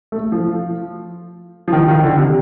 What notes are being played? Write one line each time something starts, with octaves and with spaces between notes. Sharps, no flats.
A3
F3
F3
D#3
D#3
D3
C3